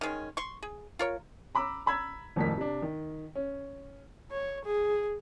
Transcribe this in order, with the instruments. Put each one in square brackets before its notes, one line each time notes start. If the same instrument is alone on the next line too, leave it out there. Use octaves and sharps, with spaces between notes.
[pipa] D#3 G#3 C#4
C6 C#6
G#4
F4 A#4 C#5
[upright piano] A#5 B5 D6 E6
A#5 B5 E6 G#6 B6
D#1 G#1 F2 A2 A#4 B6
C3 D4
D#3
C#4
[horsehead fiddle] C#5
G#4